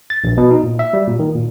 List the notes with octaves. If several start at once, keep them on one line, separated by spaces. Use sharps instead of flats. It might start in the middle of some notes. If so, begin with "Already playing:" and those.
A6
A#1
B2
D#4
A#2
E5
G3
A#2
D#3
A#2